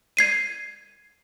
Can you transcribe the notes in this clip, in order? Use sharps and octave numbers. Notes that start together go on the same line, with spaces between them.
G#6 C7 D#7